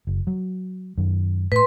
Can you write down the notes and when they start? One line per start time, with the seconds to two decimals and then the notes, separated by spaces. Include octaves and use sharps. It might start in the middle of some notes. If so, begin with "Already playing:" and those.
0.07 F#1
0.27 F#3
0.98 F#2 D#3
1.52 A2 B4 C6